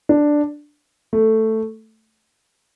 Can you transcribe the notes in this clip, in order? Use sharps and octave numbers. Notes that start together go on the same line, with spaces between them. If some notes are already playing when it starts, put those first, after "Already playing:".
D4
A3